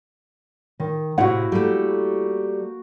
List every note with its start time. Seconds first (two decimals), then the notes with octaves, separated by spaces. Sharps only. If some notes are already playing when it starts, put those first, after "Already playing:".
0.80 D#3
1.18 A2 C3 E4 F#4 F5 F#5
1.52 G3 A3 A#3